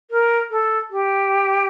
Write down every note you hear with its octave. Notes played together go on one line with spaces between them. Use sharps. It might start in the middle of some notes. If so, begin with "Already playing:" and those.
A#4
A4
G4